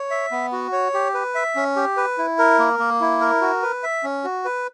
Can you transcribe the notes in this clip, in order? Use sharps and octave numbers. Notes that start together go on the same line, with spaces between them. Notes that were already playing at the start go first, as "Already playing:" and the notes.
Already playing: C#5
E5
B3
F#4
C#5
G4
B4
E5
C#4
G4
B4
E4
A#4
A#3
A#3
E4
A#4
F#4
B4
E5
C#4
F#4
B4